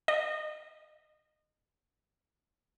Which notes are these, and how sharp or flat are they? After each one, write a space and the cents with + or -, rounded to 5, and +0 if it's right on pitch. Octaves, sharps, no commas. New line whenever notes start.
D#5 -25